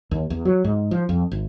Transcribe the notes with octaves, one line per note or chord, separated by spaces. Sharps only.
D#2
E2
F#3
G#2
F3
F2
G#1